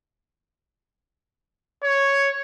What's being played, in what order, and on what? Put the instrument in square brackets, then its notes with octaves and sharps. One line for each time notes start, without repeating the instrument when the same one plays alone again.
[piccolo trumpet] C#5